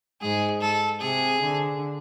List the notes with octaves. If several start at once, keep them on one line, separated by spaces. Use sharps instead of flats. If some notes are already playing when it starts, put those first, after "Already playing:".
G#2 G#4
A4
C3 G#4
D3